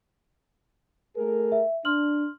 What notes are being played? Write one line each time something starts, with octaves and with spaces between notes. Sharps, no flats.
A3 G#4 A#4
E5
D4 C6 F6 F#7